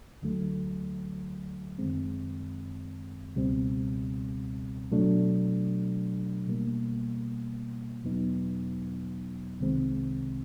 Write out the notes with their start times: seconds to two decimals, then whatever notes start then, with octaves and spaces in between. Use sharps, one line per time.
0.22 D2 D3 F#3 A3
1.78 F#2 D#3 G#3 C4
3.35 C#2 B2 G3 C4
4.92 B2 F#3 A3 D4
6.47 B2 G3 A#3
8.04 E2 B2 F#3 B3 D#4
9.60 C2 C3 D#3 G#3 C4